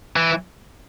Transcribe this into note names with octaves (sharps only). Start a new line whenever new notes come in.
E3